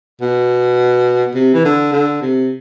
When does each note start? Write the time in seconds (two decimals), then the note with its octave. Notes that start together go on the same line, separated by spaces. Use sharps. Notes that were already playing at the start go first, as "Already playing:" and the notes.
0.21 B2
1.35 C3
1.54 E3
1.65 D3
1.92 D3
2.22 C3